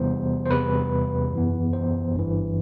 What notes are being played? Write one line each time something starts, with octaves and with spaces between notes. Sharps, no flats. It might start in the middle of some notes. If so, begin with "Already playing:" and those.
Already playing: E2 C3 E3 G3 B3 C5
C5
E2 C3 G3 B4
F#2 E3 B3
C5
G1 G2 E3